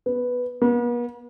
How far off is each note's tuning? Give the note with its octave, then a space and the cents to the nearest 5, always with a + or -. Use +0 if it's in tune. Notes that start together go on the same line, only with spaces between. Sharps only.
B3 +0
B3 -45